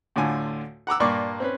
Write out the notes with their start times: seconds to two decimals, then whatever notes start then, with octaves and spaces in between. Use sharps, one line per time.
0.16 D2 A2 D3 F4 G#5
0.87 F#5 A#5 D6 E6
1.00 G2 A#2 A#3 D5 C#6
1.40 C4 C#4 B4